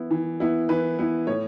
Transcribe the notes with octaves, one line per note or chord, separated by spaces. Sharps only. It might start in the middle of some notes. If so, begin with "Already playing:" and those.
Already playing: E3 B3 E4
E3
B3 E4
E3 B4
B3 E4
A2 C#5